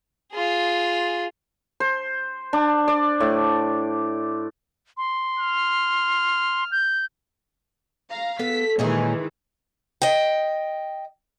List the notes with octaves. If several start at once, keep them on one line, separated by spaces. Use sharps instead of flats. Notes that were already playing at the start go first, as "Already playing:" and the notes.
F4 G#4
C5
D4
D5
A2
C6
F6
G6
F5 A#5
B3 A4 B6
A#2 D#3 E3 G#3 C#4 D#4 G#4
D#5 G5